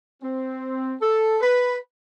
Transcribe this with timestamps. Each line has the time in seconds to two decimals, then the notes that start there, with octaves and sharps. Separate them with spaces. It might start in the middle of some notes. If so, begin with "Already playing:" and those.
0.22 C4
1.01 A4
1.41 B4